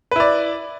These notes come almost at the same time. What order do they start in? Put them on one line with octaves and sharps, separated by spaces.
B4 E4 D5